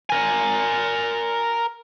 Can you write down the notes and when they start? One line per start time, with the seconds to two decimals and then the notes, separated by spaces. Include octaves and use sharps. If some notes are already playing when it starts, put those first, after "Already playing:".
0.10 A#4 G#5